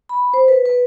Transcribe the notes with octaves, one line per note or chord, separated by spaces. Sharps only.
B5
C5
B4
B4